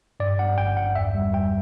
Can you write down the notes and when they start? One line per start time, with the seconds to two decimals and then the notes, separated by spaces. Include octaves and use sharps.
0.20 G2 D5
0.39 G2 F#5
0.58 G1 G5
0.76 G2 F#5
0.95 E2 E5
1.15 G3
1.33 G3 G5